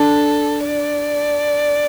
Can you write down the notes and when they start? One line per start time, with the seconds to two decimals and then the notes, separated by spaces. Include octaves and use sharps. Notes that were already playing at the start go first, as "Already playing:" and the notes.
Already playing: D4 A4
0.60 D5